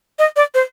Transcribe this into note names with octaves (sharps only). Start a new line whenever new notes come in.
D#5
D5
C5